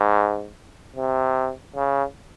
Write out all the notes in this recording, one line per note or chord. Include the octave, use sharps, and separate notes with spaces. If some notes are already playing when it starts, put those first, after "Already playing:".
Already playing: G#2
C3
C#3